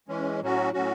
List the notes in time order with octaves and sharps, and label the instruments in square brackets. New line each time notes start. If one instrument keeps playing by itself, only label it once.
[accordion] E3 G#3 C#4
A2 F#3 C#4 F#4
A2 F#3 C#4 F#4